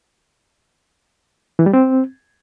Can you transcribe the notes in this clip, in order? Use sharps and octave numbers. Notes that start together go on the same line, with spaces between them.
E3
G3
C4